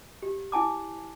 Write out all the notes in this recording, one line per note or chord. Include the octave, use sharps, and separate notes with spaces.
G4
E4 G#5 A5 D6